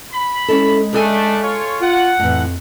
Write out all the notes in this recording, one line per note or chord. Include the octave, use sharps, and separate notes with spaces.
B5
G#3 C#4 E4 A4
A3 D4 G#4 A4 G#5
F4 C#5
F4 F#5
F2 A2 E3